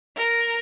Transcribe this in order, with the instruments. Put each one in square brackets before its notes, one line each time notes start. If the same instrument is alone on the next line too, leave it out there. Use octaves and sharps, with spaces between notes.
[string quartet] A#4